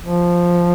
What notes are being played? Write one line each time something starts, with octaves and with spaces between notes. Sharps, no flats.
F3